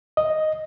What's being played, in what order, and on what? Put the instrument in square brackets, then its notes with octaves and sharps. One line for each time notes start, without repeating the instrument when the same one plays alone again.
[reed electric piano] D#5